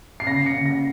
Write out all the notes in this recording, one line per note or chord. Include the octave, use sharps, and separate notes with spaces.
C7
C#3 A#6
C#7
C#3
A#6